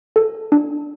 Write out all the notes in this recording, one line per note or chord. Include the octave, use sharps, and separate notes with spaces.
A4
D4